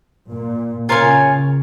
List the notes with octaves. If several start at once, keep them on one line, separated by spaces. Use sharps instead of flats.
A#2
C#3 F4 A#4 C#5 G#5